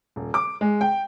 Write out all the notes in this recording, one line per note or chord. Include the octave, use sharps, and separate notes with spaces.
D#1
D6
G#3
G5